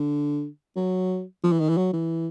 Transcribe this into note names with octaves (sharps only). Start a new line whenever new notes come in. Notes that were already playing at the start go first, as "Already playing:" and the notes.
Already playing: D3
F#3
F3
E3
D#3
E3
F#3
E3